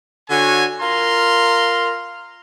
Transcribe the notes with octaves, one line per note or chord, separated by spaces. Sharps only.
D3 F#4 C#5 G#5
F4 A#4 A#5 C6